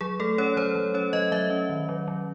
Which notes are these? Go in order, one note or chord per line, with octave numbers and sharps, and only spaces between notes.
F#3 G#4
A3 A4
C#4 C#5
F#3 C5
F#3
C#4 C#5
F#3 D#5
F#3 E5
C#4
D#3
F#3
F#3